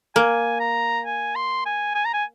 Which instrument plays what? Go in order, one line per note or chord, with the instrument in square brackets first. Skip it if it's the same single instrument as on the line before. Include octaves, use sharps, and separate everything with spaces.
[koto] A#3 [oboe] G#5
[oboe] A#5
G#5
C6
G#5
G#5
A#5
G#5